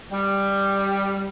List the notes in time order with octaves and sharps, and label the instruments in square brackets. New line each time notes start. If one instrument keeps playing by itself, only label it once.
[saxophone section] G3